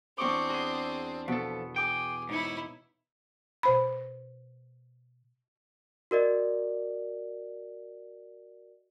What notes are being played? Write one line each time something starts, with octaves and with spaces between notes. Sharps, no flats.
E2 C4 D4 C#6 D6
F#4 G#4
B2 F3 A4
G#4 G5 D6 G6
G#2 D#4 E4 C#5
B2 C5 B5
F#4 A#4 D5 D#5